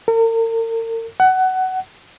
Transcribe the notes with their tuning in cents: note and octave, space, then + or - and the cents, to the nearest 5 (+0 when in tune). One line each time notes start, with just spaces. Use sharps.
A#4 -45
F#5 +20